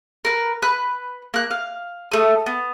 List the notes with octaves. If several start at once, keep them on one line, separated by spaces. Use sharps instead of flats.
A#4 B4
B4 F#6
A#3 F#6
F5
A3 D#6
B3